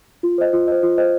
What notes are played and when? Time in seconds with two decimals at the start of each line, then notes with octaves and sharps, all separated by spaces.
0.23 F4
0.38 C5 D#5
0.53 F4
0.67 C5 D#5
0.83 F4
0.98 C5 D#5